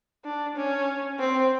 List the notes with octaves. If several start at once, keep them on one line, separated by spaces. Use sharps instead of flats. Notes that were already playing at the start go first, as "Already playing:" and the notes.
D4
C#4
C4